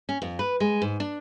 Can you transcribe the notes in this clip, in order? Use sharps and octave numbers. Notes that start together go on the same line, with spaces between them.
C#4
F2
B4
G#3
G#2
D4